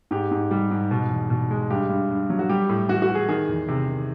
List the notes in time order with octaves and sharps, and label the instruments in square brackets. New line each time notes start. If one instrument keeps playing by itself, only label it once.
[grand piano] G#2 G4
G#2
G3
G#2
B2
E2
B2
G#3
G2 G4
G2
G2
F#3
F#4
G3 G4
A2
E3 F#4
F#4
E3
G#4
D#3 G#4
E2
C3
D#3